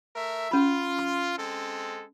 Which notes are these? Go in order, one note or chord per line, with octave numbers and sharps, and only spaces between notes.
A3 A#4 E5
C#4 F4 B5
C6
G#3 C4 A4